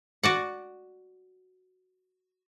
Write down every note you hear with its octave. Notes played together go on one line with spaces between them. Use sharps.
F#4 D5 F#5